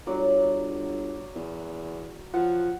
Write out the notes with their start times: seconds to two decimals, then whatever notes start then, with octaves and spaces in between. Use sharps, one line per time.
0.07 G1 F#3 D5
1.35 E2
2.34 F3 F#5